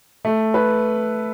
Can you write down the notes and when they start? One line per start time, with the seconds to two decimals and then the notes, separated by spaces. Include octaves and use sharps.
0.25 A3
0.54 B4